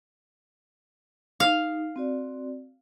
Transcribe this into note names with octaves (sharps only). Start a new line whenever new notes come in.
D#4 G#4 F5
C4 F#4 D5